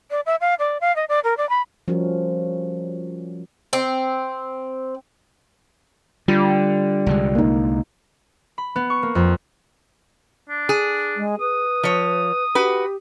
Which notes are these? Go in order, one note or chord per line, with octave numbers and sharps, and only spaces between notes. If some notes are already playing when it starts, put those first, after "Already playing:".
D5
E5
F5
D5
F5
D#5
D5
A#4
D5
B5
F3 G3 C#4 F#4 A#4
C4
D3 G3 F4
C2 D3 G#3
A#3 D#4
B5
B3
C#6
A#3
F2
D4
G#4
G#3
B4 D#6
F3 C#5
F#4 G4 B4